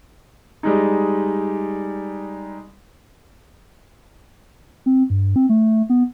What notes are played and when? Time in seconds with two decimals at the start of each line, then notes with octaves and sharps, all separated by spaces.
0.63 G3 G#3 D#4
4.86 C4
5.10 G2
5.36 C4
5.49 A3
5.90 B3